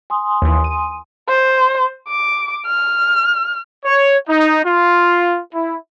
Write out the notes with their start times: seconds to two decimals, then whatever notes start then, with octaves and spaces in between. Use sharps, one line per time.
0.10 G#5 C6 D#6
0.42 D#2 E3
0.64 D#7
1.28 C5
2.08 D6
2.66 F6
3.85 C#5
4.26 D#4
4.64 F4
5.53 E4